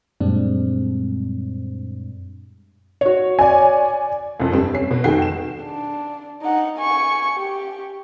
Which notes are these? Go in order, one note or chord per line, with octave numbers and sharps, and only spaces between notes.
F#2 A#2 G3 G#3 C4 D4
F#4 C#5
D5 G#5
C2 F2
G1 G3 C4
C#4 C7
B2
F1 D#3 F#4 G#4 G5 C7
E7
D4
D#4 F#5
G#5 C#6
G4